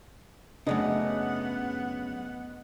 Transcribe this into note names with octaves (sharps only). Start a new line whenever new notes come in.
F#2 A#2 C#3 A3 B3 D4 D#5 F#5